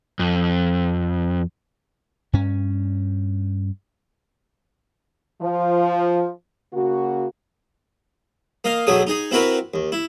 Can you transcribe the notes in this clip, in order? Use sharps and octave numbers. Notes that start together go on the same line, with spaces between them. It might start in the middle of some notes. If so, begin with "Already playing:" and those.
F2
G2 C#4
F3
C#3 A#3 F#4
A#3 D#5 F5
B1 F#3 A3 G#4 D#6
D#4 G#4
C4 E4 F#4 A#4 B4
D#2
E4